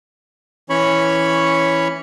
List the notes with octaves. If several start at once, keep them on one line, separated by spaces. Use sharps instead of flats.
E3 C#4 C#5 B5 C#6